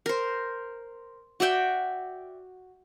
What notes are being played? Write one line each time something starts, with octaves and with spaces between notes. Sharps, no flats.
A#4 C5
F#4 D5 E5 G5